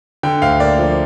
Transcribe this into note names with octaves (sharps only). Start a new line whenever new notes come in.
D3 G5
D2 F5
A#3 D5
F3